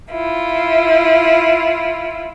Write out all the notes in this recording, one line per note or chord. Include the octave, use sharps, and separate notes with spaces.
E4 F4